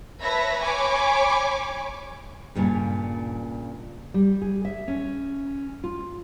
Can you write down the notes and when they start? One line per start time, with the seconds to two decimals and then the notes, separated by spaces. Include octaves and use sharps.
0.22 B4 C#5 E5 A5 B5 A#6
0.61 C#5 G#5 B5 C#6 D6
2.55 G2 A#2 C#3
4.14 G3
4.42 G#4
4.65 E5
4.88 C#4
5.84 F4